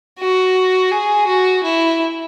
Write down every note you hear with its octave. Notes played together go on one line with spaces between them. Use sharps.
F#4
G#4
F#4
E4